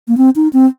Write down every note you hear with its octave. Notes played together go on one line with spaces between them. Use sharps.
A#3
C4
D#4
C4